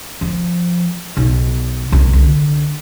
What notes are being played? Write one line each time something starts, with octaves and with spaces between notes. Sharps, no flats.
F3
B1
C2
D3